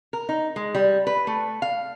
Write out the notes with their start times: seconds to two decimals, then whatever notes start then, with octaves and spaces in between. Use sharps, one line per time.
0.13 A#4
0.29 D#4
0.56 G#3
0.75 G3
1.07 B4
1.27 A3
1.62 F5